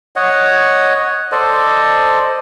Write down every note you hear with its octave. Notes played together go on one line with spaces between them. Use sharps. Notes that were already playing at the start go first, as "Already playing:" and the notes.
C#5 D#5 F#5
A4 C5 D5 D#5